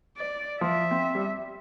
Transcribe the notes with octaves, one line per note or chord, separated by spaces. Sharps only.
D5
F3 E5
C4
G3